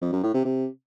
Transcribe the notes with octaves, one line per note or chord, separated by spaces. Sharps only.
F2
F#2
A2
C3
C3